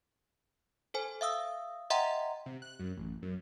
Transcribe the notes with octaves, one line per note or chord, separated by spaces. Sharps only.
A4 C5 G#5
E5 F5 D#6 E6
D#5 E5 F#5 G5 A#5 C6
C3
F#6
F#2
A1
F#2